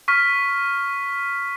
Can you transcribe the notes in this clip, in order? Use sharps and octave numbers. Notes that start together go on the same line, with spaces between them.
C#6 F6 B6